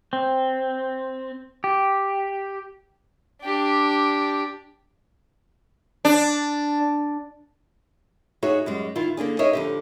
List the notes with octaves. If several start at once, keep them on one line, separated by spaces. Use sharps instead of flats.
C4
G4
D4 G4
D4
D#4 F#4 G#4 C#5 E5
F#2 G3 G#3
D#3 E4 F4
D3 A#3 D4 G#4
D#4 G#4 A#4 C#5 D#5 E5
F2 D3 G4